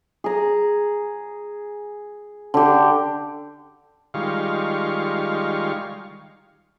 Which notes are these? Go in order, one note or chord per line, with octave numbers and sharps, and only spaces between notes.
G#4 A#5
D3 G4
D#3 G3 G#3 F4 F5 C#6